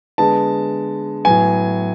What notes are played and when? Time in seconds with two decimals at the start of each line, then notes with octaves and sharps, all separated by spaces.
0.18 D3 G#3 B3 A5
1.25 A2 F#3 B3 G#5